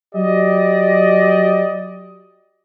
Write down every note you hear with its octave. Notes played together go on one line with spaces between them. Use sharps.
F#3 G4 D5 D#5